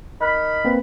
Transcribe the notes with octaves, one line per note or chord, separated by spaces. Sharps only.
D#4 A#4 B5
A#3 C4 B4